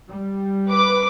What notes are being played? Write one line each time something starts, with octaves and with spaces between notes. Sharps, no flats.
G3
B4 D6